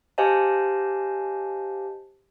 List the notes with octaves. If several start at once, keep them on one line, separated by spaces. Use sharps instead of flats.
G4 C5 D#5 F5 G#5 A5